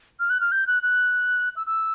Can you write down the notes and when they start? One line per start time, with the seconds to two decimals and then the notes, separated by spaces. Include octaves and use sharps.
0.20 F6
0.30 F#6
0.41 F6
0.52 G6
0.67 F#6
0.83 F#6
1.56 E6
1.67 E6